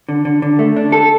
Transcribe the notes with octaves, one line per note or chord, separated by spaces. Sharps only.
D3
D3
D3
A3
D4
A4